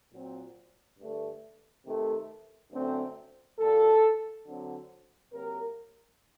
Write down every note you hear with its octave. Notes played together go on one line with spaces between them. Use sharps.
A#2 F#3 C4
G2 D3 A3
C3 D#3 A3
F#2 D3 A3 C4
A#2 G3 A#3 A4
D3 F#3 C4
C3 F#3 A#3 A#4